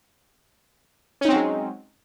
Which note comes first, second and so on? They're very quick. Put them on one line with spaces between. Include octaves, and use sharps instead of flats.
C#4 D#4 C4 F#3 G#3